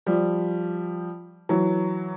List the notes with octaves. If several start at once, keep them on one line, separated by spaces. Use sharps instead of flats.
F3 G3
E3 F#3